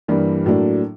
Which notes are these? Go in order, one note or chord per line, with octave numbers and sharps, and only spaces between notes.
G2 E3 G3 A#3 D4
A2 F#3 A#3 D4